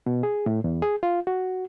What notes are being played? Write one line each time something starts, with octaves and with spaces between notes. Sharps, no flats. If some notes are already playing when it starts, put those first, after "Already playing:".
B2
G#4
A2
E2
G#4
F4
F#4